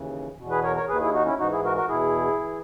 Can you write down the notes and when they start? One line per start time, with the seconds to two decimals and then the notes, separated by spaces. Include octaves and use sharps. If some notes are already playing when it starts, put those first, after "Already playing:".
Already playing: D#2 C#3 E3
0.38 E2 B2
0.51 G#4 B4
0.63 A#4 C#5
0.76 A#4 C#5
0.88 D#2 D#3 G#4 B4
1.01 E4 G#4
1.14 D#4 F#4
1.26 C#4 E4
1.39 G#2 E3 D#4 F#4
1.51 E4 G#4
1.64 F#4 A#4
1.76 F#4 A#4
1.89 E2 B2 E4 G#4
2.40 E3